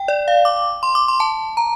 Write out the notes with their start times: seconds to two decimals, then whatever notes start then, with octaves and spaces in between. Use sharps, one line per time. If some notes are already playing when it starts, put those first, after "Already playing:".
Already playing: G5
0.08 D5
0.28 F5
0.45 D6
0.83 C6
0.95 D6
1.08 C6
1.20 A5
1.57 A#5